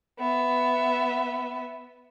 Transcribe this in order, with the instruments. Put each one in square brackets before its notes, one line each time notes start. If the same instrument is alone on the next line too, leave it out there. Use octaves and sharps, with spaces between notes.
[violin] B3 E5